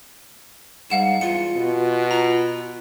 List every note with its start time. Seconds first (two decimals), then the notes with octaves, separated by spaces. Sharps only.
0.90 G#2 G3 F5 F#5 E7
1.21 E2 F4 C#7
1.57 B2
2.11 F4 A#5